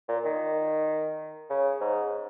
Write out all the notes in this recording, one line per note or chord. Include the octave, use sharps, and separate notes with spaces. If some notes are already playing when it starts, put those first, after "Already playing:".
A#2
D#3
C#3
G#2